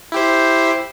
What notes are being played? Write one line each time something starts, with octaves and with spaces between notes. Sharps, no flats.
E4 G4 C5